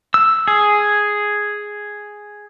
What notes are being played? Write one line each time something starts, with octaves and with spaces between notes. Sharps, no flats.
E6
G#4